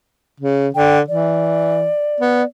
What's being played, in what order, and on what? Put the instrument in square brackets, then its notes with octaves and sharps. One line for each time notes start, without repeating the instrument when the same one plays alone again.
[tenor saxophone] C#3
[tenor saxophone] D3 [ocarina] G5
[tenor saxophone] E3 [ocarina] D5
[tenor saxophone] B3